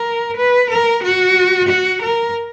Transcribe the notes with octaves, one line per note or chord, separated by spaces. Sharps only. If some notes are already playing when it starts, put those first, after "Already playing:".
Already playing: A#4
B4
A#4
F#4
F#4
A#4